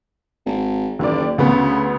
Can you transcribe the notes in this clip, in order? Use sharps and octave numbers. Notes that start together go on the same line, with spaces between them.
G#1
F#1 D#2 D5
D2 C#3 B3